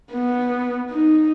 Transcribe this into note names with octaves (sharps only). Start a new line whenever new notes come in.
B3
D#4